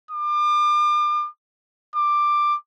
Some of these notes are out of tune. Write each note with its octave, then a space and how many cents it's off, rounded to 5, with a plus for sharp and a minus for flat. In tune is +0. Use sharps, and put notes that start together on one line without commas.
D6 +35
D6 +10